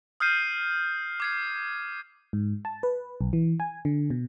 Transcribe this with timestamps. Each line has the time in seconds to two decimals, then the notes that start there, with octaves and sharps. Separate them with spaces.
0.20 D#6 F6 G6 C7 D#7
1.20 D6 G#6 C7
2.33 G#2
2.65 A5
2.83 B4
3.21 B1
3.33 E3
3.60 G#5
3.85 D3
4.10 B2